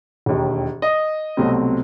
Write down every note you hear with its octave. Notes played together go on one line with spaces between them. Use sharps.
E1 D#2 D#3
D#5
C2 B2 F#3 A3 C4